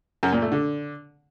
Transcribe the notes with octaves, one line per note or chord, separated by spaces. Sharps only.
F#2
A#2
A3
D3